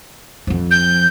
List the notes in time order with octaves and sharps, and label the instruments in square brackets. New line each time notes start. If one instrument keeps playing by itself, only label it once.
[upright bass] F2 F3
[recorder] G6